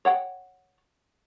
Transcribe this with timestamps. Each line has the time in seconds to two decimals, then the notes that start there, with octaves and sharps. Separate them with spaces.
0.05 C#5 F#5 G5